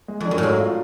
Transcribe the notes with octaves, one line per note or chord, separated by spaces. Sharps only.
G#3
F2 D4
F#2
A2
G#2 F#3
F4